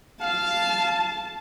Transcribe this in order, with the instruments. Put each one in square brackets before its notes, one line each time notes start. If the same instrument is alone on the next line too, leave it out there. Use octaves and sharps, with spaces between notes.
[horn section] F5 [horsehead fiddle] A5